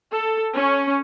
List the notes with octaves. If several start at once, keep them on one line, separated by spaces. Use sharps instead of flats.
A4
C#4